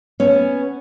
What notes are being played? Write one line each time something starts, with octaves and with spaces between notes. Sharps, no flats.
B3 C#4